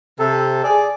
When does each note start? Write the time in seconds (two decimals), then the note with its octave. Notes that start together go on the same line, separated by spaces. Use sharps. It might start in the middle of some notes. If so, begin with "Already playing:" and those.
0.19 C3 A4
0.64 G#4 D5